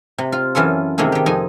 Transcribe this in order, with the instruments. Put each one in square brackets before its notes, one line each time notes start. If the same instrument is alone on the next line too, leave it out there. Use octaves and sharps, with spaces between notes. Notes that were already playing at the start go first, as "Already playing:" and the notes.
[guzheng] C3
F4
F#2 E3 C#4 F4 A4
C3 D#3 A3 A#3 G#4
D#3 G4
F2 D#4 G#5